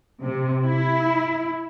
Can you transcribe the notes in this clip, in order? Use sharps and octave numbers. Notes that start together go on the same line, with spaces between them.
C3
E4